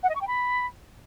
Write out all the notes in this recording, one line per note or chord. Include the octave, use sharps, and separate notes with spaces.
F#5
D#5
C#6
G5
B5